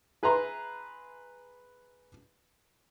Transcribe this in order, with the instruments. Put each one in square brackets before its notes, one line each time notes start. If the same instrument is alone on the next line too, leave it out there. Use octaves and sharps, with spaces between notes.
[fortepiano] G#4 B4 E5 A#5 C6